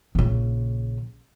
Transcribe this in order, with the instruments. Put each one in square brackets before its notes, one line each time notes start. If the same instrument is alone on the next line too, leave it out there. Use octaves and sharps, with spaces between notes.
[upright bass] A#1 C#3